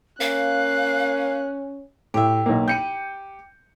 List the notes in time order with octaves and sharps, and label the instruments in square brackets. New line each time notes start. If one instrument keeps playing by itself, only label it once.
[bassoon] A#3 [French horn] C#4 [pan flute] F5 [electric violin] F#6
[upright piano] A2 [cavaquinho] G4 E5
[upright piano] B1 A#3
[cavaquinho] G4 B5 [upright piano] G6 C#7 D#7